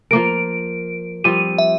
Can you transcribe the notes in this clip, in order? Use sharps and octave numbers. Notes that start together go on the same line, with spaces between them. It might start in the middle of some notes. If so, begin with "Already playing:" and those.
F3 A#3 A#4 D7
F3 G3 C4 D#7
E5